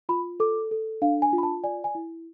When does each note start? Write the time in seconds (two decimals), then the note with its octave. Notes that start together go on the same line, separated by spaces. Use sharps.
0.09 F4 B5
0.40 A4 D6
0.71 A4
1.02 D4 F5
1.22 G#5
1.33 F4
1.38 B5
1.43 A5
1.64 D5 G#5
1.84 G#5
1.95 E4